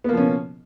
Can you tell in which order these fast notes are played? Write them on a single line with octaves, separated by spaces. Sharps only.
B3 A#3 F3 C#4 B2